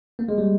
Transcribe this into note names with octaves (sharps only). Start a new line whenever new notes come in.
A#3
G#3
G3